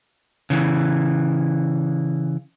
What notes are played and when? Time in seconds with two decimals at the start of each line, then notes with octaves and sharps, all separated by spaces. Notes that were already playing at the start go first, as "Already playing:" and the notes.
0.50 C#3 E3